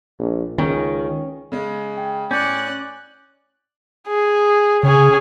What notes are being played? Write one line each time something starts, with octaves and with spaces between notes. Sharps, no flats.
A#1
C#2 D#3 C#4
C#3 G#3
G5
A2 C#4 D5 F#6 G6 C#7
G#4
C#3 C#4 G#4